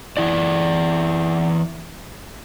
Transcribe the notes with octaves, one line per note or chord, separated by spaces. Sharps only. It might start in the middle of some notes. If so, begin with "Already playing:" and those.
E3 E4 D5